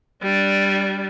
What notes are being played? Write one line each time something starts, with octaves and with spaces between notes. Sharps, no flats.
G3 D4